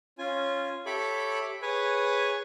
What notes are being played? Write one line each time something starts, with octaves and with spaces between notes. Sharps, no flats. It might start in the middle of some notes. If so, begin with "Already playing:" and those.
C#4 F4 G#5
G4 A4 C#5 E5 B5 D6
G#4 B4 C#5 G#5